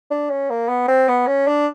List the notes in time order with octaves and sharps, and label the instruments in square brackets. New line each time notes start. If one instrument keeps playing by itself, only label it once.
[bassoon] D4
C#4
A#3
B3
C4
B3
C#4
D4